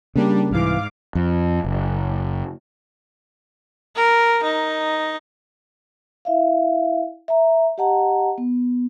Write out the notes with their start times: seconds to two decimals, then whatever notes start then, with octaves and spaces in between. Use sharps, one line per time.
0.16 C#3 G3 A#3 D4
0.51 C2 G#2 E3 F5 D6
1.15 F2
1.64 F#1
3.97 A#4
4.43 D#4
6.25 E4 E5 F5
7.28 E5 A#5
7.78 G4 D#5 F#5 A5 A#5
8.38 B3